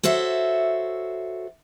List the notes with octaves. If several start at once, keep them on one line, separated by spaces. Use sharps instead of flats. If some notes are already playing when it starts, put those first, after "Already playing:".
F#4 A4 C5 C#5 E5